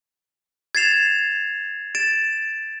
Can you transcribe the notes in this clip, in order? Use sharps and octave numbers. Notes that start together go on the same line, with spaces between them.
G#6 A6 C7 E7 F7
A6 D7 E7